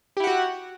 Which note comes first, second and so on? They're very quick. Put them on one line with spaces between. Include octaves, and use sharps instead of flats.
G4 E4 F#5 F#4